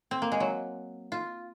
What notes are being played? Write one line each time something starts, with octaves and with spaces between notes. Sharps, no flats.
C4
A#3
G#3
F#3
F4